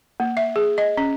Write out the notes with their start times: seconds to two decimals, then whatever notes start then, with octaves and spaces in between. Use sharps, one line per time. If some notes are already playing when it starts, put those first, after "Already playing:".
0.20 A#3
0.37 E5
0.56 G#4
0.78 D#5
0.97 C#4